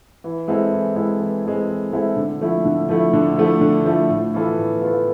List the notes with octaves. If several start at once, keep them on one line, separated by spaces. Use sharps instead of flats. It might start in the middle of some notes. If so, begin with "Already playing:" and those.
E3
G#3 C4 E4 A4
E3
G#3 C4 E4 A4
E3
G#3 C4 E4 A4
E3
G#3 C4 E4 A4
D3
F3 A3 E4
D3
F3 A3 E4
D3
F3 A3 E4
D3
F3 A3 E4
A2
E3 B3 F4 A4
A2
E3 B3 F4 A4